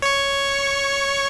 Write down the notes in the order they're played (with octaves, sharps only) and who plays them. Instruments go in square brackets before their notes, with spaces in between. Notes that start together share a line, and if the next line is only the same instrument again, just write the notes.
[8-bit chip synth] C#5 C#6